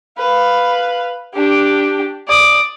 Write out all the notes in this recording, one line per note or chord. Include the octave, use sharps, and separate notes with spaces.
B4 F5
D4 G4
D5 D#6